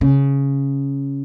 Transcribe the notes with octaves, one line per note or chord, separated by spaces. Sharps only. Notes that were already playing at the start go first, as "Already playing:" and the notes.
C#3